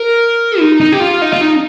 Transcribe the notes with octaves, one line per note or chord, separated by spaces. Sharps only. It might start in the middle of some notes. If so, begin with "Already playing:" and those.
Already playing: A#4
D#4
D#4
G4
F4
D#4
F4
D#4